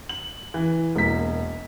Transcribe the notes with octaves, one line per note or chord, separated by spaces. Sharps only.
F#7
E3
E1 A#3 B6